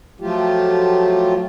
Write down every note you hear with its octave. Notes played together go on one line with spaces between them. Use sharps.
F3 F#3 A3 F4 G4